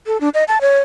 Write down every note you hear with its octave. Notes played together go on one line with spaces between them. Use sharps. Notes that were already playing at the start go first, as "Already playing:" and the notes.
A4
D4
D#5
A5
C#5